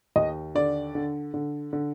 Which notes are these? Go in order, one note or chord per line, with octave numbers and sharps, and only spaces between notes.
D#2 D#5
D3 D5
D3
D3
D3